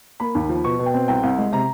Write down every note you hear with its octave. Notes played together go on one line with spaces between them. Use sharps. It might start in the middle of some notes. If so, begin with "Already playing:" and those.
A#3 B5
D#2
F3
B2 C#6
B2
G5
C4
C2 G5
C2
G#3
C3 A#5